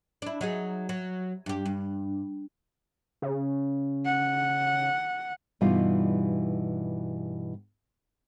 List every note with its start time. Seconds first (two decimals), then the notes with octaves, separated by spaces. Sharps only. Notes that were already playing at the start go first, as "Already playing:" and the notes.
0.22 D4 E4
0.41 F#3 D#4 G#4
0.89 F#3
1.46 G2 G4
1.66 G2
3.22 C#3
4.05 F#5
5.61 G2 B2 E3 G3 D#4 F4